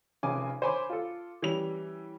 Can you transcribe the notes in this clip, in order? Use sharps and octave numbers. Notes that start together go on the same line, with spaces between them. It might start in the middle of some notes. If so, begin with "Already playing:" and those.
F1 F2 C#3 G#5 D6
C5 C#5 G#5 B5 C6 D6
F4 A4
E3 G3 C#4 F7